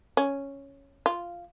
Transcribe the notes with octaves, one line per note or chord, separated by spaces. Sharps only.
C#4
F4